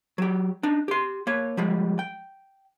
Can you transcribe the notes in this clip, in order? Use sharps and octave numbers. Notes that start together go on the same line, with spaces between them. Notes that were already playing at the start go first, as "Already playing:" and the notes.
F#3 G4
D4 D#4
G4 C6
A#3 C#5
F3 G3 G#3
G5